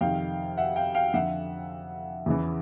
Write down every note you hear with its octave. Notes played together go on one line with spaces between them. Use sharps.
F2 C3 D#3 F5 G5
E5 F#5
F5 G5
F5 G5
F2 D3 E5 F#5
E2 C#3 E3